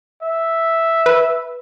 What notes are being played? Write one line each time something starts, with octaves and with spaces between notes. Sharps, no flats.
E5
B4